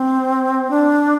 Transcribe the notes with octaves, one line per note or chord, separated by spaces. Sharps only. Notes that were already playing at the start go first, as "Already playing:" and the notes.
Already playing: C4
D4